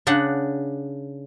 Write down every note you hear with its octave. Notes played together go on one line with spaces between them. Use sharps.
C#3 D4 F#5